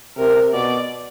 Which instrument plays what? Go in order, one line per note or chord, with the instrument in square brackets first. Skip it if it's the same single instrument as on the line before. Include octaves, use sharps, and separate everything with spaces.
[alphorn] C3 [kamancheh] A#4
[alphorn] B2 [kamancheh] D5